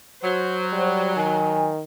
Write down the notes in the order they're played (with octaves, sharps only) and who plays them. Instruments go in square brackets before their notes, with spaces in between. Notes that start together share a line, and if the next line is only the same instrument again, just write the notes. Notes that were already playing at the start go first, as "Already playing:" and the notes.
[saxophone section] F#3 [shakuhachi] C5
[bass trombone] G3
[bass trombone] D#3 [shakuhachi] G#5